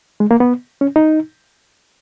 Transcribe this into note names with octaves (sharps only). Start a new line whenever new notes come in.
G#3
A#3
B3
C#4
D#4